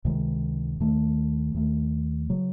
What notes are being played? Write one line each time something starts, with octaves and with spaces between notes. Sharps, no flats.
C#2 C3 D#3 G#3
D#2 D#3 A3
D#2 D#3 A3
C#3 F#3